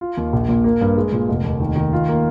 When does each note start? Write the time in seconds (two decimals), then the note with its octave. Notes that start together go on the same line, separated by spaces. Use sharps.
0.01 F4
0.17 D#2
0.33 A#1
0.49 A#2
0.64 A#3
0.81 G2
0.97 G#3
1.12 A#2
1.29 F1
1.44 D#2
1.60 D#3
1.76 D#3
1.93 F4
2.09 A#3